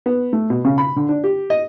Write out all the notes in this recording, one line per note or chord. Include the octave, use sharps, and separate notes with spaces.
B3
A3
B2
C#3
B5
D3
D4
G4
D#5